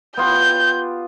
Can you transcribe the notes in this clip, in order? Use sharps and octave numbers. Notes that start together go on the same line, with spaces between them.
B3 F4 G4 G6